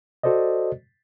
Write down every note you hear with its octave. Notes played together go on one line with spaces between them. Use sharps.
F#4 A4 C5 D5 D#5